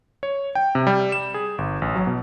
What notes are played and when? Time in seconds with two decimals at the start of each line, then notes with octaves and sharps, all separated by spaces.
0.23 C#5
0.55 G5
0.75 C3
0.87 G3
1.12 E7
1.34 G#4
1.58 G1
1.82 A1
1.96 F#3
2.07 B2